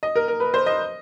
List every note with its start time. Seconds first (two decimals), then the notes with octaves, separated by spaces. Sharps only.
0.03 D#5
0.16 A#4
0.28 A#4
0.40 B4
0.54 C5
0.66 D#5